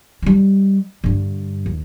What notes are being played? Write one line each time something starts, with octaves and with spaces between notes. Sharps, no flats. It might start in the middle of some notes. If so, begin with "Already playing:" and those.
G3 G#3
G2 D3
D#2